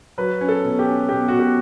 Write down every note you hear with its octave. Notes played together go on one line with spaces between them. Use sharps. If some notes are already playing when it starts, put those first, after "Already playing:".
F#3 B4
C#4
A4
B2
G4
C#4
B2 G4
B2 F#4
G4